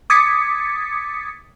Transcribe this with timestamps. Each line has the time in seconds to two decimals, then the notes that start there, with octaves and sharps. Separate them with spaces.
0.10 D6 D#6 G#6 A6 B6 C#7